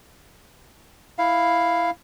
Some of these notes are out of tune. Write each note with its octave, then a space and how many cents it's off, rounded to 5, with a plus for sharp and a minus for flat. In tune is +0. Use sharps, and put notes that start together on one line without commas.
E4 +0 F5 +0